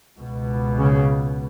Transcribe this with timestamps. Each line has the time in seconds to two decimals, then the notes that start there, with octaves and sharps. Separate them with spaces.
0.17 C#2 B2
0.78 C#3